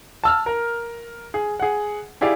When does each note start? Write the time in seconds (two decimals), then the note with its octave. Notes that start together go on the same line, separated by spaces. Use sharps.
0.24 A5 E6 F6
0.46 A#4
1.34 G#4
1.60 G#4 F#5
2.21 E4 G4 G#4 D5 F5